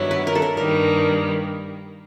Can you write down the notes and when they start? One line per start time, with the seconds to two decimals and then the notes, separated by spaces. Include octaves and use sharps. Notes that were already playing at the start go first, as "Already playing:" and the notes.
Already playing: G2 D#3 F#3 B3 E4 C#5
0.11 B4
0.27 A#4
0.35 A4
0.42 A#4
0.57 G2 D#3 G3 A#3 A#4